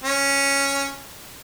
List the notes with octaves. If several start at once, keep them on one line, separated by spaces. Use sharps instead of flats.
C#4